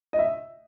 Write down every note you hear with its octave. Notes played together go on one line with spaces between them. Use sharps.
D#5
E5